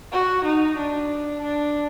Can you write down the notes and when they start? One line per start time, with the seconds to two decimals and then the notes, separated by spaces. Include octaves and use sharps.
0.12 F#4
0.45 D#4
0.77 D4
1.41 D4